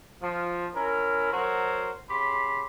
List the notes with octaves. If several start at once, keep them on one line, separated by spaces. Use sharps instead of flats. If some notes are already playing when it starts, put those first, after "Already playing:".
F3
C#4 E4 A#4
F#3 F#4 A#4 C5
C#3 G4 B5 C6